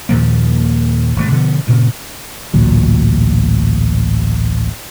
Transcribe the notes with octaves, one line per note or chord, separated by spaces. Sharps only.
D#2 A#2 F3 A#3
G#1 C3 A3
B2 D3 F3 B3
G2 A#2 C#3
A1 D2 A#2 F#3